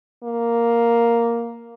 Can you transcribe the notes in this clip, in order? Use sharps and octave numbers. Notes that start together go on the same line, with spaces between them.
A#3